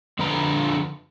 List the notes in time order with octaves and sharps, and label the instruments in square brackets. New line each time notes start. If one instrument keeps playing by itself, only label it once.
[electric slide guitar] F2 D3 D4 B4 A#5